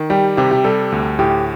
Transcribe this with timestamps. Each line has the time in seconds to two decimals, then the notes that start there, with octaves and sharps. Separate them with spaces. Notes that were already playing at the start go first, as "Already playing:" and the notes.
Already playing: D#3
0.10 G3 G4
0.37 C3 G4
0.51 G4
0.64 G3 A4
0.92 D2
1.19 A2 G4